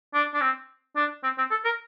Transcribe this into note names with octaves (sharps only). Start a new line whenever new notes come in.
D4
D4
C4
D4
C4
C4
A4
A#4